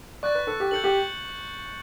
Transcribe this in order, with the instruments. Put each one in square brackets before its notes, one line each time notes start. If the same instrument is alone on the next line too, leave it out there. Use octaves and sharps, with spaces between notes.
[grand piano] D5 [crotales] C#6 F#6 A6
[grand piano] B4
A4
G4
[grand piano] A4 [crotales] G6 C#7 F#7
[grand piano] G4